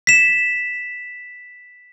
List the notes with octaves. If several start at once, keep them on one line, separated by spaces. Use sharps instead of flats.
B6 E7